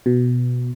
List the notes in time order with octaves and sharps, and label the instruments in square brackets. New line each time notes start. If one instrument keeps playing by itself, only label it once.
[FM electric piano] B2